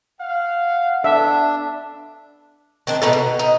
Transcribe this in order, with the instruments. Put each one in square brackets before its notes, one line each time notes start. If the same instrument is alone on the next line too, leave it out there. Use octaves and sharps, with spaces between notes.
[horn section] F5 F#5
[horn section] B3 A4 [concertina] D4 [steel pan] E5
[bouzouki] D#3 C4 D4
B2 D#4 A4
B2
D#4